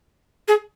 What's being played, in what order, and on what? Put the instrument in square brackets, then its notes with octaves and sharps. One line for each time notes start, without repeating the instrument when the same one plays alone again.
[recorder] G#4